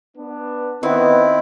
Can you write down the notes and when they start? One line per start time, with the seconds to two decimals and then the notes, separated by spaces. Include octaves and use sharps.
0.17 B3 D4
0.83 D#3 B3 C4 E4